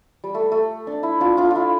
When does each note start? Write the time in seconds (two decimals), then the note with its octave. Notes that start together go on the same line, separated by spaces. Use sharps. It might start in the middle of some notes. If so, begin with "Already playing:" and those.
0.24 G3
0.35 A3
0.52 A3
0.87 D4
1.03 E4
1.20 D4 F4
1.37 D4 F4
1.51 E4 F4